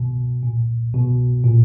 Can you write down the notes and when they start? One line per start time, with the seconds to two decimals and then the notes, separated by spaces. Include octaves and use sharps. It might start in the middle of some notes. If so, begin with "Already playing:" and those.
Already playing: B2
0.43 A#2
0.94 B2
1.44 A#2